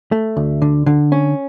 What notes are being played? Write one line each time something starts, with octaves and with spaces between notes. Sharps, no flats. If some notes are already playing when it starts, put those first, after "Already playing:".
A3
D2
D3
D3
C#4